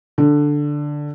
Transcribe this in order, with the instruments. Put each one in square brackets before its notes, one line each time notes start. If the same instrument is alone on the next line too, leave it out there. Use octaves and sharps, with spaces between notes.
[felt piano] D3